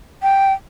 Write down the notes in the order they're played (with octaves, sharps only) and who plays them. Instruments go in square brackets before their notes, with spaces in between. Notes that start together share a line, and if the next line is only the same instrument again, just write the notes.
[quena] G5